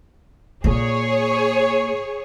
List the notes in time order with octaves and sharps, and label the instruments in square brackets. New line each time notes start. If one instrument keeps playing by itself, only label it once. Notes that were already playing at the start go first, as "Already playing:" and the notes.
[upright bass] A#2 [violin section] G#4 C#5